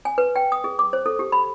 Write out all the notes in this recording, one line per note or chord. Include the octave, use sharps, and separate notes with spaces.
G#5
B4
G5
D#6
G#4
D6
C5
A4
G4
B5